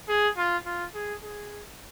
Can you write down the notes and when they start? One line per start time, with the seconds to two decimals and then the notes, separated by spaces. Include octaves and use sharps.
0.08 G#4
0.37 F4
0.66 F4
0.94 G#4
1.23 G#4